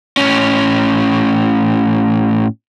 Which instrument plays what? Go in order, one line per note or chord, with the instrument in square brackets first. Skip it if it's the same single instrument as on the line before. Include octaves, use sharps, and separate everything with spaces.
[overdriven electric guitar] A2 C#4